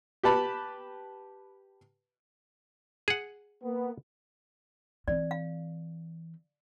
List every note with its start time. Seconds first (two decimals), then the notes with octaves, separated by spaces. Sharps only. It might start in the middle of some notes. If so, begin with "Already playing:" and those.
0.23 G4 B4 A5 B5
3.08 G#4 F#5
3.64 A#3 B3
5.08 E3 C4 D5
5.31 F5